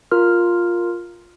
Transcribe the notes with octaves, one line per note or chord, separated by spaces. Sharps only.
F4 A#4 F6